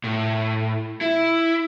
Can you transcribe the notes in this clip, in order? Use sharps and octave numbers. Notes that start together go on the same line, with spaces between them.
A2
E4